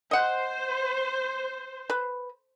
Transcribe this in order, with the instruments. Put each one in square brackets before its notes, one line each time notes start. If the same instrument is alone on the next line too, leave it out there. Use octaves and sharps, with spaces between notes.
[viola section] C5 [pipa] D#5 F#5
[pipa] B4